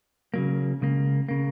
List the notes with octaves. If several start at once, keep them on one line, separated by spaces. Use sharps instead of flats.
C#3 F#3 A#3
C#2 C#3 A#3
C#3 A#3